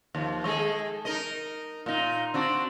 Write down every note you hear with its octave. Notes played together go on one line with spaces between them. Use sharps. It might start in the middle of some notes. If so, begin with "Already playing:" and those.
D#2 F3
G#3 G#4 A4
D#4 A#4 D#5
A#2 D#4
C4 D4 F#4